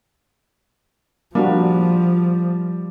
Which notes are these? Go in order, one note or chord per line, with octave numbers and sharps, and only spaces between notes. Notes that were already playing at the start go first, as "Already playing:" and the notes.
F3 G3 A#3 D4 F#4